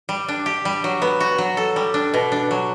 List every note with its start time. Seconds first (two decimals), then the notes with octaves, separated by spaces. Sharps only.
0.09 G3
0.28 D4
0.46 G4
0.65 G3
0.84 F#3
1.02 B3
1.20 F#4
1.38 F#3
1.57 A4
1.76 G3
1.94 D4
2.14 B2
2.32 D4
2.51 F#3